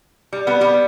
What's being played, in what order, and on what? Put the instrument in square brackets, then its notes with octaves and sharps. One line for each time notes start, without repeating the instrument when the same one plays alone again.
[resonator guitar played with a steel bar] G3
G3 B3
G3 B3